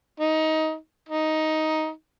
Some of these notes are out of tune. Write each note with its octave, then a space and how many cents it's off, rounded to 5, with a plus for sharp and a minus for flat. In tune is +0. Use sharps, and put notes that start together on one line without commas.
D#4 +20
D#4 +10